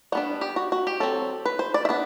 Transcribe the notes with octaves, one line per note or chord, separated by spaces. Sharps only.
G3 B3 D4 F#5
G4
F#4
F#4
G4
F#3 C4 A4
B4
C5
D5
E5
B3 D4